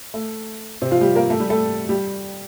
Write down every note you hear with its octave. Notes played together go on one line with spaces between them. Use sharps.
A3
C3 C4
F3 F4
G3 G4
A#3 A#4
A3 A4
G3 G4
A3 A4
G3 G4